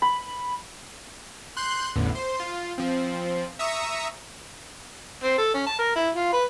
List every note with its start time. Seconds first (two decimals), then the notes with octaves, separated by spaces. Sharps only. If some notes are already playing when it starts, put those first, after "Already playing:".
0.02 B5
1.57 C6 F#6 G6
1.96 A1 E2 A2 D3
2.15 C5 C6
2.40 F4
2.78 F3 C4
3.59 E5 A#5 C#6 D#6 E6
5.23 C4
5.38 A4
5.54 C#4
5.67 A5
5.79 A#4
5.96 E4
6.16 F4
6.33 B4